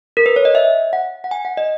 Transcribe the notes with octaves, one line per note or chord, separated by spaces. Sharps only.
A#4
B4
C#5
D#5
E5
F#5
F#5
G#5
F#5
D#5